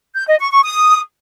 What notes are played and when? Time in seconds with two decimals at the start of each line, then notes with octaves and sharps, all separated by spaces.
0.16 G6
0.27 D#5
0.39 C#6
0.51 C#6
0.63 D#6